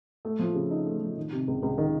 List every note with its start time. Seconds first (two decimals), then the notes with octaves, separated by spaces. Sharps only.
0.25 A3
0.39 F3
0.55 C#3
0.71 D#4
0.87 A3
1.01 F3
1.17 D#3
1.32 C3
1.48 C#2
1.63 C#2
1.78 D#3